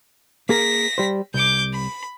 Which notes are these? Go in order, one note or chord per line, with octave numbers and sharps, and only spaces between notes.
A#3 G#4 A#4 A#6 B6
G3 C5
C2 D6 G6
B5